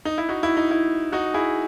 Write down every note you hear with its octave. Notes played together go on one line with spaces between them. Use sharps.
D#4
E4
D#4 F#4
E4
D#4
E4
D#4 F#4
E4 G#4